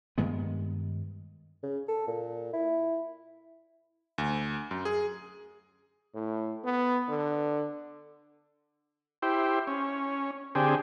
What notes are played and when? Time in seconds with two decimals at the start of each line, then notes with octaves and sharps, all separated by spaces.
0.18 G2 D#3 G#3 B3
1.63 C#3
1.88 A4
2.07 A#2
2.53 E4
4.18 D2
4.71 F#2
4.85 G#4
6.14 A2
6.65 B3
7.09 D3
9.22 E4 G4 C5
9.67 C#4
10.55 D3 C4 G4 G#4